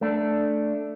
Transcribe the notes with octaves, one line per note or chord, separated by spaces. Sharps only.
A3 D4